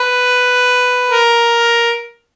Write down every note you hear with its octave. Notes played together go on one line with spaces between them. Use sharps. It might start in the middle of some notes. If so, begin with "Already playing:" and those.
Already playing: B4
A#4